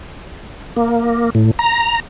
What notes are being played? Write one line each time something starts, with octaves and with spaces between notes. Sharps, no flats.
A#3
A2
A#5